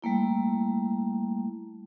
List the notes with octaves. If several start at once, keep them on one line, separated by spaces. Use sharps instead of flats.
G3 A3 A#3 E4